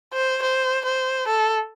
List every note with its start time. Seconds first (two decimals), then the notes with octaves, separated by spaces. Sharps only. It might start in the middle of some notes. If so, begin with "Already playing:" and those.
0.13 C5
0.42 C5
0.85 C5
1.28 A4